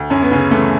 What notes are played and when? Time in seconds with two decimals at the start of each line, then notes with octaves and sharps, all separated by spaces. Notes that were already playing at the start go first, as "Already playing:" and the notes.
Already playing: D2
0.10 F#2 C#4
0.22 B3
0.31 C#3 C#4
0.51 E3 A3